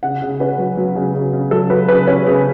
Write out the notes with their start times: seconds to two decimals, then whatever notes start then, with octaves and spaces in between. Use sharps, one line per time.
0.03 C#3 F#5
0.22 C#3
0.40 C#4 B4
0.59 F#3
0.77 F#3
0.95 C#3
1.14 C#3
1.33 C#3
1.51 F#3 A4
1.70 F#3 B4
1.88 C#3 B4
2.07 C#4 C#5
2.26 C#3